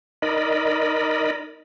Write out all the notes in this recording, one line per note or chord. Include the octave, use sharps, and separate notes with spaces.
D#4 A#4 D5 D#5 B5